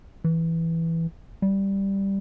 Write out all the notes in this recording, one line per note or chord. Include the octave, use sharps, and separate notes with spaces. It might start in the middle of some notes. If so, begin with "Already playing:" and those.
E3
G3